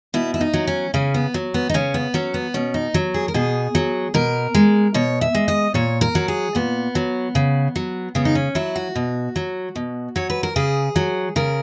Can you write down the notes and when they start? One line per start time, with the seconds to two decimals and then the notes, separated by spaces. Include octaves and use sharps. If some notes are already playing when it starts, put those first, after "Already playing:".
0.14 B2 E4
0.34 E4
0.41 D#4
0.54 F#3
0.67 C#4
0.94 C#3 C#4
1.14 B3
1.34 F#3
1.54 B3
1.69 D#4
1.74 C#3 C#4
1.94 B3
2.14 F#3 C#4
2.34 B3
2.54 B2 C#4
2.74 D#4
2.94 F#3
3.14 G#4
3.28 A#4
3.34 B2 G#4
3.75 F#3
4.14 B2 A#4
4.55 G#3
4.94 B2 C#5
5.21 E5
5.35 G#3
5.48 D#5
5.74 A#2 C#5
6.01 A#4
6.15 F#3
6.28 G#4
6.55 A#2 B3
6.95 F#3
7.35 C#3
7.76 F#3
8.15 C#3 B3
8.25 D#4
8.35 C#4
8.55 F#3 E4
8.76 F#4
8.95 B2
9.36 F#3
9.76 B2
10.16 F#3 C#5
10.30 B4
10.43 A#4
10.56 C#3 G#4
10.96 F#3
11.36 C#3 A#4